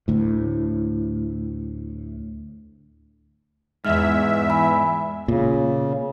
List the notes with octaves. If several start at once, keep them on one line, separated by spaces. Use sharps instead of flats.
D2 A2
E2 G#2 G#3 E5 F6
G#5 B5
A#2 C#3